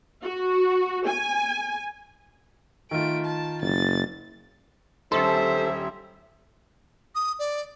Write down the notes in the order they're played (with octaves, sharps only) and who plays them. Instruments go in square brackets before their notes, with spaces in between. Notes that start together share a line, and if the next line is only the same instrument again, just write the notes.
[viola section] F#4
G#5
[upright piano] D#3 F4 [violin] A3 D7
[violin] A5
[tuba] F#1 [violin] A6
[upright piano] D#1 C#4 C6 [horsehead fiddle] G4 E5 [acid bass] A4 [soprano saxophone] C5
[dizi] D#6
D5